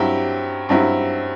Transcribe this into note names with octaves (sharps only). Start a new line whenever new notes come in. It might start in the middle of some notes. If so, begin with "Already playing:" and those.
Already playing: G2 F#3 C4 E4 G4
G2 F#3 C4 E4 G4